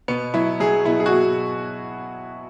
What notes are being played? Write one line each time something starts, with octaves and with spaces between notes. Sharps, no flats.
B2 B3
F#3 E4
F#3 G#4
B2 E4
G#4
F#4
B2